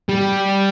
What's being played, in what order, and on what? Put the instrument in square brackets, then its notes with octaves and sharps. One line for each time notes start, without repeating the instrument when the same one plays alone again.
[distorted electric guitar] G3